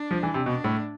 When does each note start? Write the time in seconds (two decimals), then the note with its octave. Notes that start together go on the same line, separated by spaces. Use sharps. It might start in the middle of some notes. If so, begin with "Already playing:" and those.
Already playing: D4
0.11 F3
0.23 E3
0.34 C3
0.46 B2 D4
0.64 A2